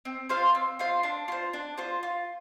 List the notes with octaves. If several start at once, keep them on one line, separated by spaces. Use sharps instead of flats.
C4
F4 C5 F5
C4
F4 C5 F5
D4
F4 C5
D4
F4 C5
F4